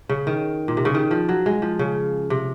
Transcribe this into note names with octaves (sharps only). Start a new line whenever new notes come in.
C#3
D#3
A#2
C3
C#3
D#3
F3
F#3
G#3
F3
C#3
C3